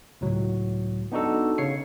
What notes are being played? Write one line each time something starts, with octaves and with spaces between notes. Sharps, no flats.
C#2 A2 F#3
B3 D4 D#4 F#4 A4
C#3 C#5 C7 C#7